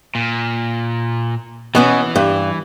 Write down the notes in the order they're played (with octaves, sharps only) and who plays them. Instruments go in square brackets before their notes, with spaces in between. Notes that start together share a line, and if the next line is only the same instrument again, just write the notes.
[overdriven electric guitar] A#2
[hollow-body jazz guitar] B2 B3 C#4 [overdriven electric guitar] E3
[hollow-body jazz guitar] G2